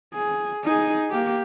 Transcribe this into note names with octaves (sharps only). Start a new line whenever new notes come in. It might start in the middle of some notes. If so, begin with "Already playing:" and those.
G#4
D#4 G#4
A#3 G4